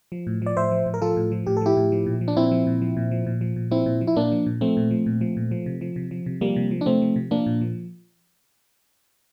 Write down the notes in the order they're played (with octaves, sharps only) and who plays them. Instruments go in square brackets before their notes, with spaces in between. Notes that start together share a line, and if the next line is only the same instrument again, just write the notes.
[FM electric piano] F3
A2
F3 D5
A2 C5 E5
F3
A2
A#4
F3 F4 A4
A2
F3
A2 G4
A4
F3 E4 G4
A2
F3
A#2
F3
D4
A#2 C4 E4
F3
A#2
F3
A#2
F3
A#2
F3
A#2
F3 C4 E4
A#2
F3
E4
A#2 A#3 D4
F3
A#2
F3 A3 C4
A#2
F3
A#2
F3
A#2
F3
C3
F3
C3
F3
C3
F3 G3 A#3
C3
F3
D4
C3 A3 C4
F3
C3
F3 A#3 D4
A#2
F3